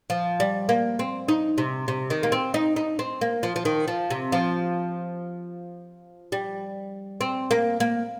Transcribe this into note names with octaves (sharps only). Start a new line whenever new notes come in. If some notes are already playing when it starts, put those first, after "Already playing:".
F3
G3
A#3
C4
D#4
C3
C3
D#3
A#3
C4
D#4
D#4
C4
A#3
F3
F3
D#3
F3
C3
F3
G3
C4
A#3
A#3